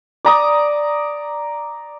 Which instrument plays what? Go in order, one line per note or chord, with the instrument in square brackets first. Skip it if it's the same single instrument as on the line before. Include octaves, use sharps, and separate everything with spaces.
[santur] D5 A#5 D#6